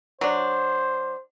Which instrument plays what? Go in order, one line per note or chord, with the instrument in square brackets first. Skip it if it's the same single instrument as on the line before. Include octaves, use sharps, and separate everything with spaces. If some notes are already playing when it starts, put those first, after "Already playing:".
[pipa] F#3 D4 [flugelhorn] C5